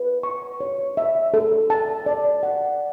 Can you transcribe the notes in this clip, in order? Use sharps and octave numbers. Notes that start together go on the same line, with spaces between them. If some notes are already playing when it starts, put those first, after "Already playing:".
Already playing: B4
C#6
C#5
E5
A4
A5
D5
F#5